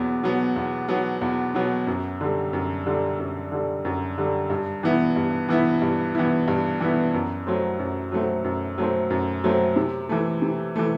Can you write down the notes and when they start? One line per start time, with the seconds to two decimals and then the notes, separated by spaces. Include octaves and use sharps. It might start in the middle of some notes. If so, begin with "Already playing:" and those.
Already playing: E2 B2 F#3 B3
0.23 B2 F#3 B3
0.56 E2
0.88 B2 F#3 B3
1.21 E2
1.55 B2 F#3 B3
1.87 F#2
2.21 D3 G3
2.53 F#2
2.86 D3 G3
3.19 F#2
3.52 D3 G3
3.85 F#2
4.18 D3 G3
4.50 G2
4.83 E3 B3 E4
5.16 G2
5.49 E3 B3 E4
5.82 G2
6.15 E3 B3 E4
6.48 G2
6.80 E3 B3 E4
7.14 F#2
7.47 F#3 A3 C4
7.79 F#2
8.12 F#3 A3 C4
8.44 F#2
8.78 F#3 A3 C4
9.10 F#2
9.44 F#3 A3 C4
9.76 C3
10.09 E3 A3
10.42 C3
10.76 E3 A3